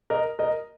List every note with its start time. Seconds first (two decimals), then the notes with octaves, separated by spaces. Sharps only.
0.10 A#4 D#5
0.39 A#4 D#5